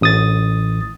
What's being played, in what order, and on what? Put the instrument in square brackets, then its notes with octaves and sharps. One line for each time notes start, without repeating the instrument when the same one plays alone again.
[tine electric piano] A1 D#6 A6